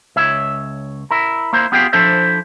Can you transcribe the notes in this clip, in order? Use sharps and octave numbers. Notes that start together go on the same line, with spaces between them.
C#2 C#5 E5
E4 A#4
A#3 E4 C5
B3 F4 G4 G#4 F5 G5
F3 D4 E4 A4 C5 E5